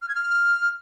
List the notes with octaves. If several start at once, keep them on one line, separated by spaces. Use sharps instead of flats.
F6
G#6
F6